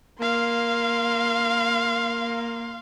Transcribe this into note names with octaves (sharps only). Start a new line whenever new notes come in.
A#3 F5 C6